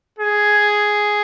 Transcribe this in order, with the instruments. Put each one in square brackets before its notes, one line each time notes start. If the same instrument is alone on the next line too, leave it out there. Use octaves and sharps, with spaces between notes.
[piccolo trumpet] G#4